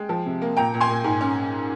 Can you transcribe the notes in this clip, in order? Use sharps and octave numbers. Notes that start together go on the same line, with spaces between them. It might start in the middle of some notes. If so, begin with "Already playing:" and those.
Already playing: G#3 G5
F3
C3
A#3
A#2 G5 A#5
A#2
G#5 C6
A#2
G#2
C#4